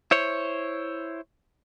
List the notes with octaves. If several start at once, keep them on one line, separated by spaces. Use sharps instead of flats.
E4 C5 C#5